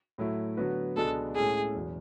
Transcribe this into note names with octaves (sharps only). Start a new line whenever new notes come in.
A2 F#3 A3 E4
D3 F#3 B3 F#4 B4
C#2 B2 G#3 B3 D4 A4
A2 G#3 C#4 E4 G#4 A4
E2 B2 F#3